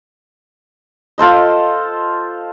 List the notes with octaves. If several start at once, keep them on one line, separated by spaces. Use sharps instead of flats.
F4 A4 C5 D#5